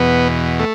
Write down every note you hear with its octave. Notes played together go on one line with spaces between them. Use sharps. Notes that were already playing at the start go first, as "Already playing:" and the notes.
Already playing: E2 B2 B3
A3